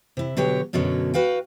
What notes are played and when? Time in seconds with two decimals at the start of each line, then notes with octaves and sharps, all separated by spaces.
0.17 C3 E4
0.37 B2 D3 F#3 G4 C#5
0.73 F#2 B2 D3 F#3 C#4
1.14 F#4 B4 F5 G5